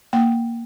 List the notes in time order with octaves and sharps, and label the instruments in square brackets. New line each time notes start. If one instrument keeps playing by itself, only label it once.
[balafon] A#3 G5